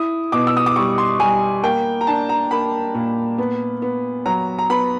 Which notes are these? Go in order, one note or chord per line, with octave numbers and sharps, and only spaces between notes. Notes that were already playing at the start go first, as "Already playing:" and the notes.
Already playing: E4 D#6
B2 D6
E6
D#6
D6
G3 C#6
C6
G3 G#5
A#3 G5
A#5
D4 A5
A#5
A#3 B5
A#2
B3
B3
F#3 A#5
A#5
B3 B5